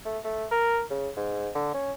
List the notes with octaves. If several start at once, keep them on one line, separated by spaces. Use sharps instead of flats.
A3
A3
A#4
C#3
G#2
D3
C#4